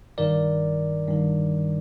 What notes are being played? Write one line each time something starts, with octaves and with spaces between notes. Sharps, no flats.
G2 D#3 A#4 D5
G2 D#3